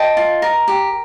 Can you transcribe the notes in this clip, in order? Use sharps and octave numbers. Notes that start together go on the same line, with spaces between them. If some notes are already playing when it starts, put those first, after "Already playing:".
Already playing: D#5 G5 A5
F4
A#4
G4